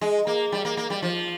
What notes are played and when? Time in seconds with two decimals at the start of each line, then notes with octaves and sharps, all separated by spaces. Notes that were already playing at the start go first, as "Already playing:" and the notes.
0.01 G#3
0.27 A#3
0.52 G3
0.65 A#3
0.77 A#3
0.90 G3
1.02 F3